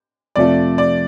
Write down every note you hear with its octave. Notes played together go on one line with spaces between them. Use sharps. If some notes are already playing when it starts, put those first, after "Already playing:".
F2 C3 F3 A3 D5
D5